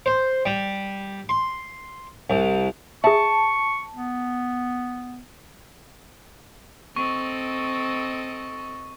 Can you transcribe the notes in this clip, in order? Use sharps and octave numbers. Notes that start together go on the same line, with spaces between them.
C5
G3
C6
C2
G#4 E5 A5 C#6
B3
C4 A4 D#5 C#6